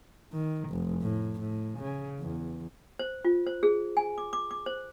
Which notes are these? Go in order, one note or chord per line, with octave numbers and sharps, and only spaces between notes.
D#3
F1
A2
A2
C#3
E2
C5
F4
C5
G#4
G#5
D6
D6
D6
C5